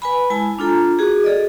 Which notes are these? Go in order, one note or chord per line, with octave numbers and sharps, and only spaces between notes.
B4 G#5 B5
G#3 E4 G#5 A5
D4 F4 A4 A#5
F#4 G#4
G#4 A4 D5 D#5